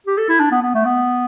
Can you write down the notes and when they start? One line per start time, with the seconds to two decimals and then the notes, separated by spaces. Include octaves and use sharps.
0.07 G4
0.17 A4
0.29 E4
0.40 D4
0.51 B3
0.62 B3
0.75 A3
0.85 B3